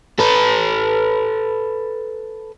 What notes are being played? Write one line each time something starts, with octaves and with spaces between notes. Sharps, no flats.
A4 B4